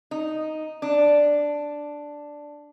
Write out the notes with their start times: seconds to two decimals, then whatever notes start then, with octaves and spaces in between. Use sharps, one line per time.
0.11 D#4
0.82 D4